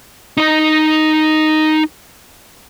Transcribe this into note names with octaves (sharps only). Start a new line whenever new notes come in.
D#4 D#5